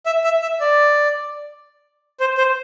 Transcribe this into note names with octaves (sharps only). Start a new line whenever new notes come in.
E5
E5
E5
D5
C5
C5